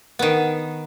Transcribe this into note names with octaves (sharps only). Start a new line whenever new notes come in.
D#3 B3